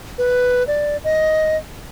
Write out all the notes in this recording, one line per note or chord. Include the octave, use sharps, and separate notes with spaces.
B4
D5
D#5